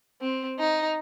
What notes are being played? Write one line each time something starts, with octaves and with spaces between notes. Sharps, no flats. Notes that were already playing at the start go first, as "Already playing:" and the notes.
C4
D#4